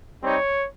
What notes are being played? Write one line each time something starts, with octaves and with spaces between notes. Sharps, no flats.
G3 C4 D#4 G4 C#5